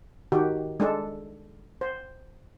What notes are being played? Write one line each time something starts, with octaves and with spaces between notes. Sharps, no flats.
D#3 F#4 G4
G#3 D4 A4
C5